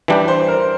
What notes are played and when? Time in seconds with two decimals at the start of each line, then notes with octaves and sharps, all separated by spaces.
0.08 E3 G3 D4 G4
0.28 C5
0.48 A#4